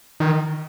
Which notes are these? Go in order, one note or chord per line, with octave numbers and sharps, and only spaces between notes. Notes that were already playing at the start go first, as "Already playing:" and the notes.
D#3